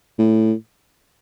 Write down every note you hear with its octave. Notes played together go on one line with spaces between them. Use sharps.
A2